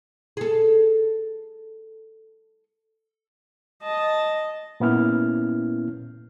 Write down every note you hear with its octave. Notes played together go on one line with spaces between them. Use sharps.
G#4 A4
D#5 A5
A#2 A#3 B3 C#4 E4 F6